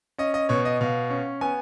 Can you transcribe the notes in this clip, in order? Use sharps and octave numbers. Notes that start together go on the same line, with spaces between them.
C#4 D#5
D#5
B2 C#5
D#5
B2 F5
C#4
B3 G#5